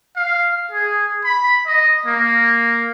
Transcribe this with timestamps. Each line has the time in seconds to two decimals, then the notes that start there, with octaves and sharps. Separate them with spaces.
0.17 F5
0.71 G#4
1.25 B5
1.67 D#5
2.06 A#3